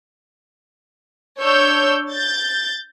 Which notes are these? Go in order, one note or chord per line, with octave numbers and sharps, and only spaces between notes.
D4 C#5 E6 G6
G6 A6